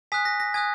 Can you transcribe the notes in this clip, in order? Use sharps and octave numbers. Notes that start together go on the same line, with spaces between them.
G#5 D#6 F#6 B6
A#6
A#6
G#5 D#6 F#6 G#6